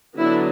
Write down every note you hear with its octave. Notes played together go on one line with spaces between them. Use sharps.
D3 F#3 B3 D4 E4